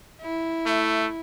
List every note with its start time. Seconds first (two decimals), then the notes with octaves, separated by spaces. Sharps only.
0.22 E4
0.66 A3